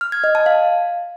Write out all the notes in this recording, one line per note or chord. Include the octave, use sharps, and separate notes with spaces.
F6
G#6
D#5
A5
F5